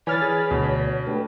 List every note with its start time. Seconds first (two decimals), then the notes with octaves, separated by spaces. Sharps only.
0.07 E3 B4 C#5 D5 G#5 B5 F6 A6
0.22 G#4
0.51 D2 B2
1.07 A3 D4 G4 B4